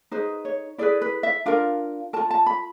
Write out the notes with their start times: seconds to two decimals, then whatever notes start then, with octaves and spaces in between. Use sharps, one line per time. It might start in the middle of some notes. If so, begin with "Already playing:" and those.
0.11 D#4 G#4 B4 C5
0.45 C#5
0.78 E4 G#4 B4 D5
1.02 B4
1.23 E5
1.46 D4 F4 A#4 F5
2.13 F4 A#4 A5
2.31 A5
2.46 B5